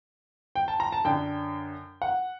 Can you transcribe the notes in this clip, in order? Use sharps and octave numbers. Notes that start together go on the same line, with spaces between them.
G5
A5
A#5
A5
F#2 D3 G5
F#5